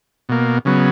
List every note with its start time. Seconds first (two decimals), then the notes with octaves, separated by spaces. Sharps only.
0.29 B2 A#3
0.65 C#3 F#3 B3